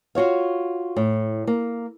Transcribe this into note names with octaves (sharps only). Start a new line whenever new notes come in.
F4 F#4 C#5 F5
A2
A#3